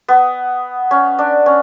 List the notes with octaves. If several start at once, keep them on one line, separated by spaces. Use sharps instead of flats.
B3
C#4
D4
C#4